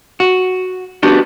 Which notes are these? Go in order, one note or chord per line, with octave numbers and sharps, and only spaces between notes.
F#4
B3 D4 F#4 G4